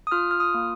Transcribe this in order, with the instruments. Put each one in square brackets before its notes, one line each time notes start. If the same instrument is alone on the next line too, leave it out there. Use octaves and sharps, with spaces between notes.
[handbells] D#6
F4 F6
F6
D#6
A#3